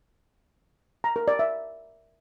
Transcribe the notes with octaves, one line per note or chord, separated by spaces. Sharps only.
A#5
A#4
D5
E5